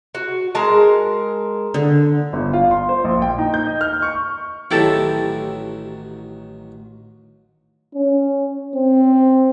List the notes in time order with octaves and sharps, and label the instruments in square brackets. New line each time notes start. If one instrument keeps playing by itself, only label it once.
[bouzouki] F#4
G#3 A#4 A5
[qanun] D3
[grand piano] G1
F4
C6
C5
A#1
G5
D#4
G6
D#5
F6
C#6
[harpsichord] A1 D#3 F#3 [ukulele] E4 G4 A4
[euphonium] C#4
C4